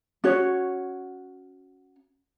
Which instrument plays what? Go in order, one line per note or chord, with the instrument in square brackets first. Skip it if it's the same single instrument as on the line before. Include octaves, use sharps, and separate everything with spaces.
[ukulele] C#4 F#4 C#5